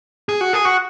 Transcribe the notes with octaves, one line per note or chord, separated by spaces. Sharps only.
G#4
F#4
G#4
F#4